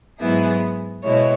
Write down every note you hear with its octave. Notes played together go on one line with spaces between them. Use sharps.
G#2 F#3 B3 E4 G#4
B2 G#3 E4 C#5